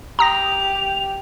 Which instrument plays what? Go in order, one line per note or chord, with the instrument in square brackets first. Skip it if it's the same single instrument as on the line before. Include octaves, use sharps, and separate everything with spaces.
[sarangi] G4 [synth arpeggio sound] A#5 D#6 A#6 [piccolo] F7